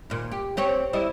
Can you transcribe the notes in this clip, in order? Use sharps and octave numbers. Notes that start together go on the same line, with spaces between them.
D#2 A#2
G4
C4 G4 C#5
G3 E4 D#5